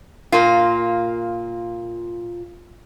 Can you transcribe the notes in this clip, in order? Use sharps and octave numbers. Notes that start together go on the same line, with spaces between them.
A#2 A#3 F4